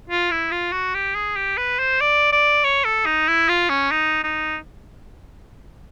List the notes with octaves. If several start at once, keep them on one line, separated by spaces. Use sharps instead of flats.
F4
E4
F4
F#4
G4
G#4
G4
B4
C5
D5
D5
C#5
A4
D#4
E4
F4
C#4
D#4
D#4